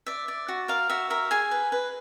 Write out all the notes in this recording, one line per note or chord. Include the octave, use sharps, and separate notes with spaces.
D5 E5
D5
F#4
A#4 F5
F#4 E5
A#4 E5
G#4 G#5
B4
B4